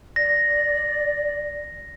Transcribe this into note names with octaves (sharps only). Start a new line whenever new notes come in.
D5 A#6